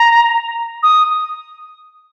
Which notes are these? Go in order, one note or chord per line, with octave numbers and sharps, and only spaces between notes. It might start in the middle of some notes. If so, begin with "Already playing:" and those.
Already playing: A#5
D#6